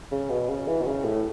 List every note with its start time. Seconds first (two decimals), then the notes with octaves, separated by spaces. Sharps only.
0.12 C#3
0.30 B2
0.49 C#3
0.68 E3
0.82 B2
0.87 C#3
1.04 A2